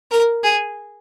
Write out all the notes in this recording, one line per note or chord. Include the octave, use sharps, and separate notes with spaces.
A#4
G#4